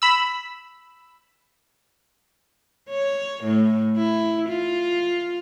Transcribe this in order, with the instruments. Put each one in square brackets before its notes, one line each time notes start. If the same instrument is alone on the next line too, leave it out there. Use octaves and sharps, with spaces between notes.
[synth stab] B5 E6
[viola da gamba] C#5
A2
E4
F4